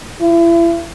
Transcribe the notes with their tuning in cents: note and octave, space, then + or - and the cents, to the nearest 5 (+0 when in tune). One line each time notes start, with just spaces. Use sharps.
E4 +35